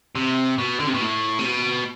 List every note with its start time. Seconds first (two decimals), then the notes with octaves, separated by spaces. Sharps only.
0.15 C3
0.58 B2
0.79 D3
0.87 C3
0.94 B2
1.01 A2
1.39 C3
1.44 B2